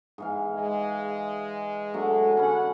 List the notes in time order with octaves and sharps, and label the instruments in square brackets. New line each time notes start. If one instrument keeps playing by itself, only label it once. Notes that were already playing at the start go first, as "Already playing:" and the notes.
[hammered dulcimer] G#2 E3 F5
[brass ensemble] G#3
[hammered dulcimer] F#3 A3 D4
[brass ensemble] D3 F#5 [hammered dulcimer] C#4 B5